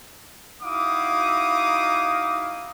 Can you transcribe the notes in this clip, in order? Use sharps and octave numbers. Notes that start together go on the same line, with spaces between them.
D#4 E4 F#4 F5 D6 D#6